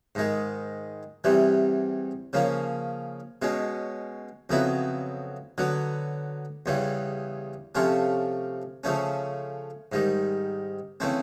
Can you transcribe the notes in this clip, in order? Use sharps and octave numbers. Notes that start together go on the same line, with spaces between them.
G#2 D#3 G#3
E2 C3 E3 G3
C#3 F3 A#3 C#4
B2 G#3 C#4
F2 C#3 F#3 B3 E4
D3 F#3 B3
E2 C#3 E3 G3
C3 F3 A3 C#4 F4
C#3 F3 A3 C#4
G#2 D#3 G3
C#3 E3 A3 C4